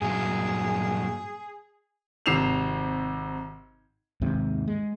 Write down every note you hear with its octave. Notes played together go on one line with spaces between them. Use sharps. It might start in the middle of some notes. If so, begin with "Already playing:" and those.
G2 A#2 F#3 G#4
G#1 C3 C7 E7 F7
D#2 G#2 C3
G#3